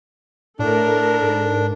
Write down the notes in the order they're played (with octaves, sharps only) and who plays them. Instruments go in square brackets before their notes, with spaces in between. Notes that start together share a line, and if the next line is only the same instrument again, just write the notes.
[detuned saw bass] A2 [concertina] D4 [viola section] A4 A#4
[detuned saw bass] G#2